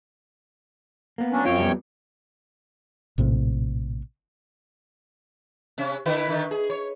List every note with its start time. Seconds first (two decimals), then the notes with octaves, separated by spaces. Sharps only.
1.18 A#3 B3
1.32 F#3 C#4 D4
1.45 F#2 C4 F4 C#5 G5
1.58 F2 G3 B3
3.18 A#1 A2 C3
5.78 C3 C#4
6.06 D3 E4 B4
6.29 D3 D#3
6.51 G#4
6.70 C#5